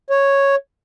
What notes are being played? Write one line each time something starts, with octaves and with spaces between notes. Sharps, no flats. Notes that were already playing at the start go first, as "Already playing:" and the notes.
C#5